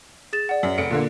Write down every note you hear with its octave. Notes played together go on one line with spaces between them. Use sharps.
G#4 A6 E7
D5 F#5
F#2
F1 C#7 D7
A#2 D3 A#3